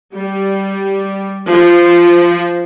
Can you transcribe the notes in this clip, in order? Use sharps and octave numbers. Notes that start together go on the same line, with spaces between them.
G3
F3